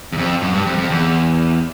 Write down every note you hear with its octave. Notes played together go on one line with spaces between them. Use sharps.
E2
F2
F#2
G2
F2
F2
E2